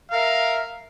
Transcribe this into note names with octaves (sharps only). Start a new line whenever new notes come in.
A#4 E5 F5